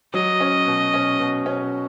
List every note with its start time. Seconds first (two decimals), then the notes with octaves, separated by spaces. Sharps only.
0.14 F#3 D#5
0.40 C#4
0.66 B2
0.94 C#4
1.19 B2
1.46 C#4